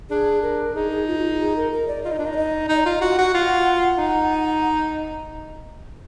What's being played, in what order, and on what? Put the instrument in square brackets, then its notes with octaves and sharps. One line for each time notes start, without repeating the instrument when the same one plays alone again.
[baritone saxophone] D4 [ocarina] G#4
[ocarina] A#4
[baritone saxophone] D#4 [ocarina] G#4
[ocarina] G#4
F4
F#4
F4
G#4
A#4
A#4
D5
[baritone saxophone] F4 [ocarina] D#5
[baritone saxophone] D#4
D4
D#4
[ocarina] D5
D#5
[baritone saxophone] D#4 [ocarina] D#5
[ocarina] D5
[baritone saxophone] F4 [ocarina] D#5
[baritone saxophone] F#4 [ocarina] F#5
[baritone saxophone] F#4
F4
D#4